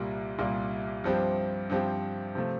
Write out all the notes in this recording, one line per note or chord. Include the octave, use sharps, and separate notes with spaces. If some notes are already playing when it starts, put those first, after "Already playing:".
Already playing: C2 A#2 G3 A#3
C2 A#2 G3 A#3
G2 F3 C4 G4
G2 F3 C4 G4
C3 F3 A3